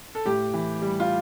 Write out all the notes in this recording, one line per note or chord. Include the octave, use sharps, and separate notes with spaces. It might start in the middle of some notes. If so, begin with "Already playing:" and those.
A4
A2 G4
E3
G3
F4